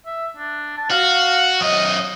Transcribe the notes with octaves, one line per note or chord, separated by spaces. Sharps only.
E5
D4
A5
F#4 F5
F#2 D#5 D#6